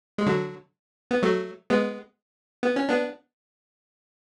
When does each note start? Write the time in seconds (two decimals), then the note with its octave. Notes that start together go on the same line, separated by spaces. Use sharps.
0.18 G#3
0.26 D3 F#3
1.11 B3
1.23 F#3 A3
1.70 G#3 B3
2.63 B3
2.76 C#4
2.89 B3 D4